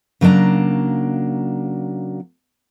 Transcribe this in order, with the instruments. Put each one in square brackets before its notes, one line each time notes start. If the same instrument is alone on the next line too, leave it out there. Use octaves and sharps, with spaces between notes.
[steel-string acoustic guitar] C#3 F#3 A#3 D4 A#5